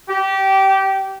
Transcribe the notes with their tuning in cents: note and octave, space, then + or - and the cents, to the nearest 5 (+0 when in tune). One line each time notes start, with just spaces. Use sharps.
G4 -20